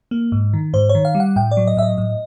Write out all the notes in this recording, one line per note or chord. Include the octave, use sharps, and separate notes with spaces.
A#3
G#2
D#3
G#2 C5
C#5
D#3
F5
G3
F#5
A2 G5
D5
F#3
D#5
A2 E5
D#5
A2